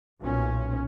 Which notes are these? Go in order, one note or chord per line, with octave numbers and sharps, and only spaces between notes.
B1 A#2 C#4